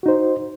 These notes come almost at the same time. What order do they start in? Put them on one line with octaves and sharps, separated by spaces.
F#4 D#4 C5